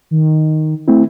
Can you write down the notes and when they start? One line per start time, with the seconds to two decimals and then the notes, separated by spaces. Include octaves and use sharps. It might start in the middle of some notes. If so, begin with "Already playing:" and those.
0.11 D#3
0.88 A3 C4 E4